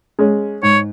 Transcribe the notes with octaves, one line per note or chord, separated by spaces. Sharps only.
G#3 C#4 G#4
G#2 C#5